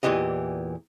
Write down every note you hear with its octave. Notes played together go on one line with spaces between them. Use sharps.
E2 A#2 E3 G4 D#5